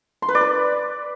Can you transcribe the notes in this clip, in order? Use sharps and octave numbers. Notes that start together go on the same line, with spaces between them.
C6
B4
D5
B4